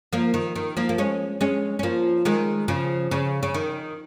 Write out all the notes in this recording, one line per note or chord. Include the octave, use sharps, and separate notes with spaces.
F3 A#3
D#3
D#3
F3 A#3
A#3
G#3 C#4
G#3 C#4
C#4
F3 A#3
D#3 G#3
C#3 F3
C#3
C#3
D#3